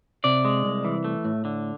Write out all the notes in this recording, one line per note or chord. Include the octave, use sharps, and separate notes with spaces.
C3 D5
G#3
C2
E3
A3
A2
D3